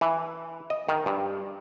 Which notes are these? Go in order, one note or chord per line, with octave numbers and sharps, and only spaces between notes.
E3
D#5
D#3
G2